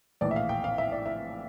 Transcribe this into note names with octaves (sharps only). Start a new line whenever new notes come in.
A#1 A2 E3 D5
E5
F5
G5
F5
E5
D5
E5